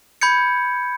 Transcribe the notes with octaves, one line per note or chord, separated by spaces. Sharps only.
B5 G6 G#6 C#7